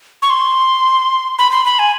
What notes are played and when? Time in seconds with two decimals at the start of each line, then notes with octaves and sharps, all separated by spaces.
0.22 C#6
0.30 C6
1.39 B5
1.51 C6
1.65 B5
1.79 G#5